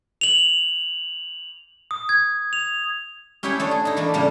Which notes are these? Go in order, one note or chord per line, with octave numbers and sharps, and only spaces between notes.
F7 F#7
D#6
G#6
F7
C#4 E4 G4 G#4 C#5 G5
A3 D4 C#5
G#4
D#4 E4
E3 A3 A#3 D4
A2 C#3 G3 A#3